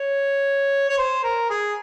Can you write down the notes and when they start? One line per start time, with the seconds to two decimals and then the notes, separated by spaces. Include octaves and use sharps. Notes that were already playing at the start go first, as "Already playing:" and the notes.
Already playing: C#5
0.89 C#5
0.98 C5
1.23 A#4
1.50 G#4